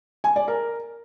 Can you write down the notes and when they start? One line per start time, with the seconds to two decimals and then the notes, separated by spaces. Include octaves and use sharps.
0.24 G#5
0.36 D5
0.48 A#4